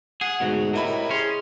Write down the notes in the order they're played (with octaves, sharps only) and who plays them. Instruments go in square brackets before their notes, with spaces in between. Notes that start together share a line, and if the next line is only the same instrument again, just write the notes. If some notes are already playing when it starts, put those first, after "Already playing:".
[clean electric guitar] G#4 [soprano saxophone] F#5
[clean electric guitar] D2 G#2 B2 [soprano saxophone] F#4 [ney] G#4
[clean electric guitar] A2 [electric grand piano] C3 E4 B5 [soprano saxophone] A#4 [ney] D#5
[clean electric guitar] C#4 [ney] G#4 [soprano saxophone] C6